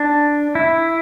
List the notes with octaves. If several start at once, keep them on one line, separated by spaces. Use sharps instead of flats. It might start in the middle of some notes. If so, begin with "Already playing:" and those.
Already playing: D4
E4